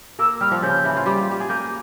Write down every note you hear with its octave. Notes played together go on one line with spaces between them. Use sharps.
A#3 A#4 E6
G3 G4 F6
F3 F4
C#3 C#4 G6
E3 E4
F4
G3 G4
F4
G4
G#4
A#3 A#4 G6